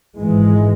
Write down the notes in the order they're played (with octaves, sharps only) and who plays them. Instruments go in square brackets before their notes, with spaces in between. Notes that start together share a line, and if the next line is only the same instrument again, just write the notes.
[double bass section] G#1 G#2 E3 G#3